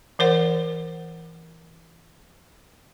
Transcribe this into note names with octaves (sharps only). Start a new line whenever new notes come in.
E3 A#4 C5 F#5